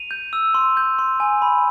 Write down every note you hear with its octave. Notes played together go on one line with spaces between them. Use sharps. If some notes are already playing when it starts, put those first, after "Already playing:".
Already playing: D#7 F7
G6
E6
C6
G6
C6
G#5
B5